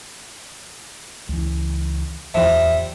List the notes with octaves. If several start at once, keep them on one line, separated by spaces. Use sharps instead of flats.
C#2 E3
D1 E2 F3 G3 E5